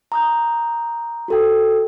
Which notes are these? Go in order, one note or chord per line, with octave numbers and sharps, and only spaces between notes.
A#5 D#6 G6
F#4 A4 G5